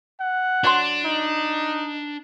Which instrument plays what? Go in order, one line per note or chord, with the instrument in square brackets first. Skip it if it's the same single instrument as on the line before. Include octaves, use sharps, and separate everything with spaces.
[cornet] F#5
[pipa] F#3 F#4 C6 [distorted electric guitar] D4
[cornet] D#4